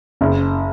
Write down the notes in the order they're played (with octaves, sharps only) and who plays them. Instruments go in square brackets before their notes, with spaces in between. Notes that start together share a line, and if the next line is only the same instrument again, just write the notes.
[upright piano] F#1